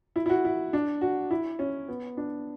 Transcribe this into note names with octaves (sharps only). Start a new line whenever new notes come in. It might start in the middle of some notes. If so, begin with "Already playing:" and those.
E4
E4
F#4
E4
D4
F#4
E4
C#4
B3
D4